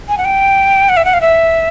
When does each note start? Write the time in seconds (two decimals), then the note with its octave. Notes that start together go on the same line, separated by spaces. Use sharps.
0.09 G#5
0.18 F#5
0.25 G5
0.89 F#5
0.97 E5
1.05 F#5
1.14 F5
1.21 E5